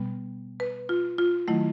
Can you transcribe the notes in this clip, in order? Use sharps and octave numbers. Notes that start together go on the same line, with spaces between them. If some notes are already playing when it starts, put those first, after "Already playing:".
Already playing: B2 G3 B3
B4
F4
F4
D#3 F#3 A3 E4